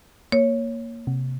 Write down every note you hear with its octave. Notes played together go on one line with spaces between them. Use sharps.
A#3 C#5
C3